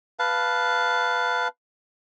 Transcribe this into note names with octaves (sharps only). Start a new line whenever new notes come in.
B4 F5 A5